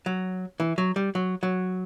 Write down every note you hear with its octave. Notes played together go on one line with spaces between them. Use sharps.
F#3
E3
F#3
G3
F#3
F#3